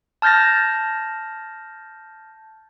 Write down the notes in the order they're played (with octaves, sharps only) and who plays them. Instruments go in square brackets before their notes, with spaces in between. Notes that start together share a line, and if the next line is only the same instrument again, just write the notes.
[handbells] A5 F6 G6 A6 A#6